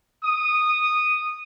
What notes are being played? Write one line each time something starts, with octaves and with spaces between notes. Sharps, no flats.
D#6